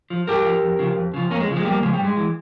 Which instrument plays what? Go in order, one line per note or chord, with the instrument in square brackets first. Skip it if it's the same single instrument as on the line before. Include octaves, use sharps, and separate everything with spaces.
[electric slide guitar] F3
G2 G4 A#4
F3
F2
C#3 F3
F2
C#3 F3
F2 A#3 C#4
G#3
C#3 F3
G#3
F2 G3 A#3
C#3 F3 G#3
G3
G2
G#3
E3